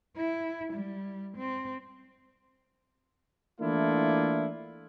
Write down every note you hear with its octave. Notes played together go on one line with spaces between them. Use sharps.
E4
G3
C4
E3 A3 A#3 D4 E4 F4